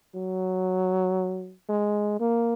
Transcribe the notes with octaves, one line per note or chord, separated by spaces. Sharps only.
F#3
G#3
A#3